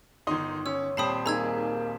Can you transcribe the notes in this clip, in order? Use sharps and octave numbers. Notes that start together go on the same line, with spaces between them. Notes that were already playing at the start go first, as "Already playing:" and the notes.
G1 D#3 D#4 C6 D#6
C#4 C#5 E6
D#1 G3 C4 A5 B5 D#6 C7
A#3 D#4 G#4 A#5 E6 G#6